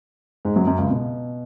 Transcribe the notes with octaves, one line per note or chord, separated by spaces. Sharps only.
G#2 G#3
F#2 F#3
F#2 F#3
C#2 C#3
B2